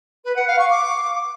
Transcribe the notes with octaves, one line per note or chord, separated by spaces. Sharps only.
B4
F#5
F5
C#6
D6